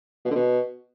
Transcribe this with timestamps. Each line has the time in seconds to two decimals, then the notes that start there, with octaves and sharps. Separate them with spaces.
0.25 B2
0.30 D3
0.35 B2